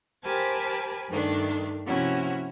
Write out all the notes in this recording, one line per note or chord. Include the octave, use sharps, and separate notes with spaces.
G4 A#4 C5 G#5 A5 B5
G2 D#3 A3 D4
C3 F3 A#3 C#4 E4 F#4